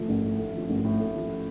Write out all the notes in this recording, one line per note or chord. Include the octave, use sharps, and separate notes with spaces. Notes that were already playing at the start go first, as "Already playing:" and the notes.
Already playing: A2 F3 A3
A1
A2
A3
F3
A1
A2
A3
F3